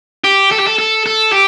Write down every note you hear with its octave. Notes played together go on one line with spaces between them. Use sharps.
G4
A4
G4
A4
A4
A4
G4